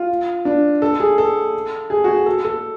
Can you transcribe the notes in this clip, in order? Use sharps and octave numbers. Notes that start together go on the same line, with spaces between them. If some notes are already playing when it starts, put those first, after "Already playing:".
Already playing: F4
D4
A4
G#4
A4
G#4
F#4
G#4
A4
A4